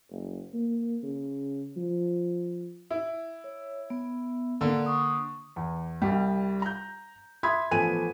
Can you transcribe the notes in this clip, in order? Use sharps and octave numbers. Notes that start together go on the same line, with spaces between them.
F#1
A#3
C#3
F3
E4
C#5
B3
D3 A#3 A4 D5
C#6 D#6
E2
C2 G3
A#5 G6
E5 B5 C6 D#6 G#6 B6
A1 F3 B3 A4 G#5 D#7